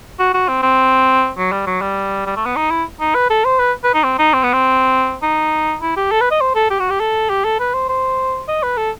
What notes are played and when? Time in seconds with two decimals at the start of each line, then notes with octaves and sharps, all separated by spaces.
0.19 F#4
0.34 F#4
0.49 C4
0.63 C4
1.37 F#3
1.52 G3
1.67 F#3
1.81 G3
2.26 G3
2.36 A3
2.46 B3
2.56 D#4
2.71 E4
3.00 D#4
3.15 B4
3.30 A4
3.45 C5
3.59 B4
3.84 B4
3.94 D#4
4.04 C4
4.18 D#4
4.34 C4
4.43 B3
4.53 C4
5.22 D#4
5.82 E4
5.97 G4
6.11 A4
6.21 B4
6.31 D#5
6.41 C5
6.55 A4
6.70 G4
6.80 F#4
6.90 G4
7.00 A4
7.30 G4
7.45 A4
7.60 B4
7.74 C5
7.89 C5
8.48 D#5
8.63 B4
8.77 A4